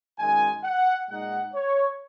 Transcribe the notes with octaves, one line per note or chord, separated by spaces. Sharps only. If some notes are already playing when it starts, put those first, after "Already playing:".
F#2 D#3 G#3 G#5
F#5
A#2 G#3 D#4 F#5
C#5